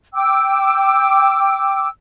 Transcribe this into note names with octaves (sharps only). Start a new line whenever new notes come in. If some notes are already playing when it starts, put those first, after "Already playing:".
G5 D6 E6